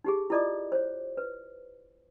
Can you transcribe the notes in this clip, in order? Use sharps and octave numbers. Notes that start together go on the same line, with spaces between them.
D#4 G4 G#4
E4 F4 A4 D5 D#5 D6
C5 C#5
B4